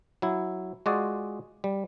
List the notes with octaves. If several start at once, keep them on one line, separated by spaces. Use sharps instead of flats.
F#3 E4
G#3 F4 F#4 G#4 D5
G3